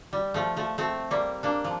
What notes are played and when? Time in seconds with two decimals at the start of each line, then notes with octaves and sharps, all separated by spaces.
0.13 G3
0.34 F3 A3
0.56 F3 A3
0.78 A3 C4
1.11 G3 A#3
1.43 A#3 D4
1.64 F3